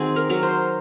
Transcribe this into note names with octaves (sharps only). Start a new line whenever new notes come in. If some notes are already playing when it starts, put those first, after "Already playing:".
Already playing: D#3 C4 F#4 G#4
A#4
F#3 A#4
C5